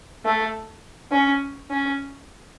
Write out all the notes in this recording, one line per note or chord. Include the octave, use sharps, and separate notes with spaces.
A3
C#4
C#4